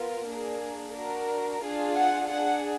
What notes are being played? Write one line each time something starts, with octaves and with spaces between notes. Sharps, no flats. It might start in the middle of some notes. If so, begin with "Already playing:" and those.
Already playing: B3 F4 A#4
A#3 D4 G#4
D4 F#4 A#4
D4 F4 G#4
F#5
D4 G#4 F#5